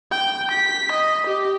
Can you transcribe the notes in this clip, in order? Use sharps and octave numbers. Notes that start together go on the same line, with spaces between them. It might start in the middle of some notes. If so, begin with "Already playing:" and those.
G5
B6
D#5
G4